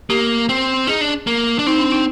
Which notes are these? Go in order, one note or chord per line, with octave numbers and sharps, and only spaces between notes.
A#3 G4
C4
D#4 G#4
D4
A#3
D4
C4 D#4
D4
D#4